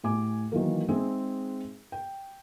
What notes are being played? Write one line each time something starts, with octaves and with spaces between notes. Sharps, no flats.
A2 G4 G#5 D6
D#3 E3 F#3 A#3
G#3 C4 D#4 G#4 E5
G5